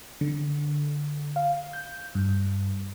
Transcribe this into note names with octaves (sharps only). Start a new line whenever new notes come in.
D3
F5
G6
G2